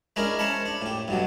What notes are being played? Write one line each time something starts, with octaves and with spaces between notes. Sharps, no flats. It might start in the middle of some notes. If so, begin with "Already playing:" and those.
G#3 C#4 D4 E4 A#4
C#4 C5 C#5 A5 B5
D4
A2 G4
G2 B2 F#3